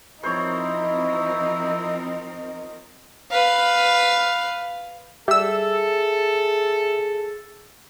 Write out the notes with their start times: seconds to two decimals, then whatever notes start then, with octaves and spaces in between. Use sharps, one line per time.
0.23 F3 C4 D#4 E4 A#4 C5 C#5
3.31 B4 F5
5.28 G3 G#4 A4 E5 E6